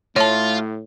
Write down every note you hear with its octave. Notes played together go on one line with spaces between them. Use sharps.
A2 A3 F4 C#5 A5